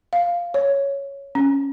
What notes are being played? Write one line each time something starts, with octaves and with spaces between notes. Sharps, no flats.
F5
C#5
C#4